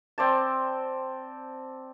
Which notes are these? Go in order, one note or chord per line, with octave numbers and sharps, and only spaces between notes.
C4 D5 A5